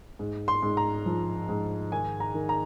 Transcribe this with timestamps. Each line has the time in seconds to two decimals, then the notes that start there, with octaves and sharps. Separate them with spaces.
0.19 G#2
0.48 C6
0.62 G#2
0.77 A#5
1.06 F3
1.49 G#2
1.92 D#3 G#5
2.20 A#5
2.34 D#3
2.49 A#5